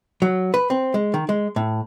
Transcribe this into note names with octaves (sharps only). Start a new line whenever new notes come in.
F#3
B4
C4
G#3
D#3
G#3
A2